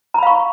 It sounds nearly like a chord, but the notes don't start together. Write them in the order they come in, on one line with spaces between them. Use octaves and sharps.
A#5 B5 F5 C#6